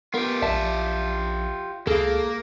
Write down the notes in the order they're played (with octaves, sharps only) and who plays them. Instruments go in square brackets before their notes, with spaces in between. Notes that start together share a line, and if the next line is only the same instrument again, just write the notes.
[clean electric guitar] B3 A#4 [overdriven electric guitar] F4 G4
[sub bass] A#1 [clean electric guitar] D5 E5 A5
[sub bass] C#2 [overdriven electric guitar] A#3 [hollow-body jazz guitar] G#4 F5 [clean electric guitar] A4